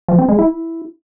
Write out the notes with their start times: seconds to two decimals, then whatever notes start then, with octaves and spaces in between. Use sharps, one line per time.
0.08 F3
0.19 C4
0.29 G#3
0.39 E4